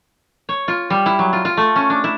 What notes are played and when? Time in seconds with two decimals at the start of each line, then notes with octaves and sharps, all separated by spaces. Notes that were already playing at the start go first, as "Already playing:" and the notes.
0.49 C#5
0.68 F4
0.90 G3
1.06 E4
1.19 F#3
1.33 F4
1.45 F4
1.57 A3
1.76 C#4
1.90 D4
2.04 E4